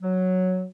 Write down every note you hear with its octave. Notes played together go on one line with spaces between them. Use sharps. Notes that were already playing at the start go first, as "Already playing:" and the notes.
F#3